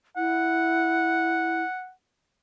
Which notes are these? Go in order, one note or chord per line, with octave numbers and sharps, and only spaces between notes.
E4 F#5